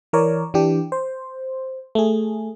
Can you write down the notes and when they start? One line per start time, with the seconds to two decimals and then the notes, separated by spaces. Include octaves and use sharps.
0.13 E3 A#4 C#5 D5
0.54 E3 D4 G4
0.92 C5
1.95 A3 G#4